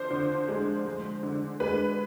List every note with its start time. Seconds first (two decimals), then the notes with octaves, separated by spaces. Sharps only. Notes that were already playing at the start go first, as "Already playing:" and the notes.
Already playing: D3 F3 C5
0.10 D3
0.48 G#3
0.85 G#3
1.23 D3
1.60 G#3 B4